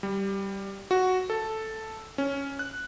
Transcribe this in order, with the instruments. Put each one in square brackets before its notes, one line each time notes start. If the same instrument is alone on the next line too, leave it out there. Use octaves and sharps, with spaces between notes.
[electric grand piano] G3
F#4
A4
C#4
F#6